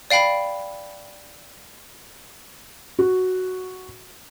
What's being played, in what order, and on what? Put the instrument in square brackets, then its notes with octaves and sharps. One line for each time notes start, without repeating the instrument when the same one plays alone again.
[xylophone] D5 F5 G5 B5
[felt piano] F#4